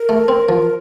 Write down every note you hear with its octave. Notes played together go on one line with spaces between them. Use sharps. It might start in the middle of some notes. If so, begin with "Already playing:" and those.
Already playing: A#4
A3
C4
F3